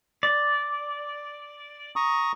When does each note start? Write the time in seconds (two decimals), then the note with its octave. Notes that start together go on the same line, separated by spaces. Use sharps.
0.23 D5
1.96 A#5 C#6 D#6